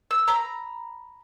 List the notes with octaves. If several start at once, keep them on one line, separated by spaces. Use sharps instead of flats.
E6
A#5 B5